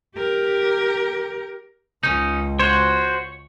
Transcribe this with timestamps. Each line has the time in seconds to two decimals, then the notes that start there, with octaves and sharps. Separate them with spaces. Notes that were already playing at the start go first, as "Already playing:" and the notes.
0.15 G4 A#4
2.03 C#2 C#4 D#4
2.59 F#4 C5 C#5